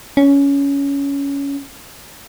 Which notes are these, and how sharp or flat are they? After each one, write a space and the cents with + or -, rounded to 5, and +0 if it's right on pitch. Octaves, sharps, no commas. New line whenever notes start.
C#4 +15